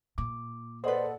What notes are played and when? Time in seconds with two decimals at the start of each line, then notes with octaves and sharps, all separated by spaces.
0.18 A#2 D6
0.84 G#4 A4 B4 C5 D5 D#5 F#5 C6